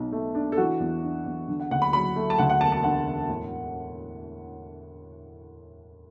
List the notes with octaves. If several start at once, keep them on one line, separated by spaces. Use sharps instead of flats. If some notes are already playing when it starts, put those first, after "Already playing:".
Already playing: B1 B2
A3
D4
A4
E3 F#4
E2
D4
E2
D3
F#5
D2 F#5
B5
F#3 B5
A3
A5
D2 F#5
F#5
E1 A5
A5
D3 F#5
E1
A2